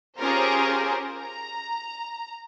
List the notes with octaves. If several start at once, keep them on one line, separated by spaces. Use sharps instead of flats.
C#4 F4 G4 G#4 A#4 C5
A#5